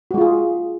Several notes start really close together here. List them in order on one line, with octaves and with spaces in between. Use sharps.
F#4 G#3 F4 G#4